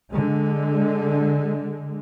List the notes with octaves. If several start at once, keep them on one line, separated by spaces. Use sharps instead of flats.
D3 G#3